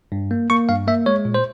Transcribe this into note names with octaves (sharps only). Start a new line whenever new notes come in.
G2
A#3
A#3 C#6
G2 F5
A#3 E5
G#3 C#5
A#2
C5